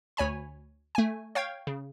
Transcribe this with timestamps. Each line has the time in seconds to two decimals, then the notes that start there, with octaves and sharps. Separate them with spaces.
0.17 D2 C#5 G#5 B5
0.95 A3 G#5
1.35 C#5 F5 G5 G#6
1.67 C#3